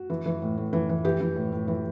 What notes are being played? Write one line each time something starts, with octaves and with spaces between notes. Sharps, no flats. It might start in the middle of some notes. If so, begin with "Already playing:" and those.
Already playing: F#4
E3
E3
A2
A2
E3
E3
E3 G4
E3
A2
A2
E3